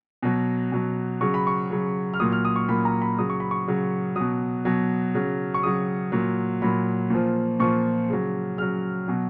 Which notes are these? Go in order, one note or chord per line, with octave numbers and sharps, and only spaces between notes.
B2 F#3
B2 F#3
C#3 F#3 C#6
B5
C#6
C#3 F#3
F6
A#2 F#3 D#6
F6
D#6
C#6
A#2 F#3 B5
A#5
B5
C#3 F#3 D#6
C#6
B5
C#6
C#3 F#3
B2 F#3 D#6
B2 F#3
C#3 F#3
C#6
C#3 F#3 D#6
A#2 F#3
A#2 F#3 B5
A#2 F3
A#2 F3 C#6
C#3 F#3
C#3 F#3 F6
B2 F#3